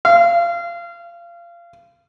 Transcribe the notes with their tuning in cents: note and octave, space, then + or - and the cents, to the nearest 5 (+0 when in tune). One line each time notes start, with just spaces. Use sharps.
F5 -25